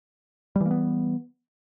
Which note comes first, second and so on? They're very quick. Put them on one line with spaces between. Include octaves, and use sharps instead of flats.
G3 E3 A#3 B3